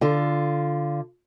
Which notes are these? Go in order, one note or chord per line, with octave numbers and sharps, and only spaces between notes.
D3 F4